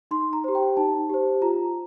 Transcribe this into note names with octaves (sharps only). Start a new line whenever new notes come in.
D#4 C6
A#5
G4 C5
G5
D#4 A5
G4 C5
F4 A#5